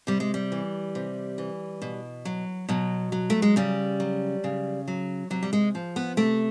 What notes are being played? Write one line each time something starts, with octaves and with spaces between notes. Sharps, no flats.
C3 G3
G#3
G3
E3
C3
E3
B2
F#3
B2 F#3
F#3
A3
G#3
C#3 G3
F#3
C#3
F#3
C3 F#3
G3
G#3
F3
B3
C3 A3